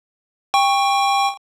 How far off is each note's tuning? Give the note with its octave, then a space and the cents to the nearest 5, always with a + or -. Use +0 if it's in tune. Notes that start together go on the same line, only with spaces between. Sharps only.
G5 +25 C#6 +0